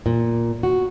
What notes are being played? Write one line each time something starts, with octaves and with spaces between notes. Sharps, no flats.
A#2
F#4